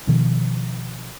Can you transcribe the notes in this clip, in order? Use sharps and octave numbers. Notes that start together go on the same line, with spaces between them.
B2 D#3 F3